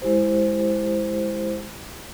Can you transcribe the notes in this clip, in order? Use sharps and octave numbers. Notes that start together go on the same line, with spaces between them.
G#3 E4 G4 C5